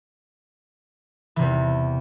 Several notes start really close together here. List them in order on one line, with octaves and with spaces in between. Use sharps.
E3 C3 E2